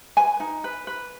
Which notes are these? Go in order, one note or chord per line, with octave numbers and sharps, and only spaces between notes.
B4 G#5
D#4
B4
B4